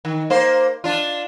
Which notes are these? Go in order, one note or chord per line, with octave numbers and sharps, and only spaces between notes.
D#3
A#3 C5
D4 F4